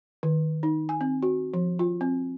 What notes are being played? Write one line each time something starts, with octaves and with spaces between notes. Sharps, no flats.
D#3
D#4
G#5
C4
F#4
F3
F4
C4